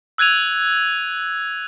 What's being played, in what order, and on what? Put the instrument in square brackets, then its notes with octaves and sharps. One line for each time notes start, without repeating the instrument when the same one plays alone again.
[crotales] E6 F#6 G#6 D#7 F7